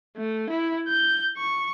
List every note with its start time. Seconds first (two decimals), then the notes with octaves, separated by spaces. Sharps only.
0.17 A3
0.50 E4
0.88 G6
1.38 C#6